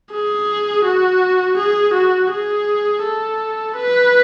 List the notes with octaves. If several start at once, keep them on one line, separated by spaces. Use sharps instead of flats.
G#4
F#4
G#4
F#4
G#4
A4
B4